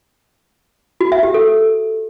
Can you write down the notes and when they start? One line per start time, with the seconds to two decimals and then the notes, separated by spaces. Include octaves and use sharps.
1.01 F#4
1.12 E5
1.23 G4
1.34 A4